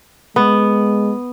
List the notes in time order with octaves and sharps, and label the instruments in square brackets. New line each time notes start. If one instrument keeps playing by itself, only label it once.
[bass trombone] G#3 [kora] B3